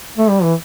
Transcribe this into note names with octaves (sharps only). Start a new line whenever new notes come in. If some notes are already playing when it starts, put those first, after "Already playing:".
A3
G3
E3